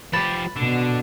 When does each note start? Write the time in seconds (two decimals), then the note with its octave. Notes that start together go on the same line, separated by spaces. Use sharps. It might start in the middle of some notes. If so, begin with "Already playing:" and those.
0.13 F3 G4 B4 A5
0.56 B2 D3